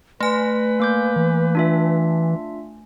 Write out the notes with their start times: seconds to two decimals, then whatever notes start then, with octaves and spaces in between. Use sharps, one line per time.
0.21 A3 B4 G#5
0.80 A#3 D6 G6
1.16 E3
1.55 D4 F4 E5